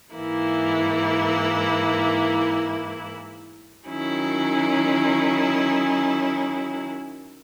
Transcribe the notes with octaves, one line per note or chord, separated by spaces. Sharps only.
G#2 E3 A#3 E4
D#3 F#3 C#4 E4